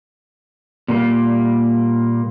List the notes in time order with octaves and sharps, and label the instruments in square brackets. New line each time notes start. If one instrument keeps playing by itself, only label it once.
[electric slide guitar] A#2 G3 A#3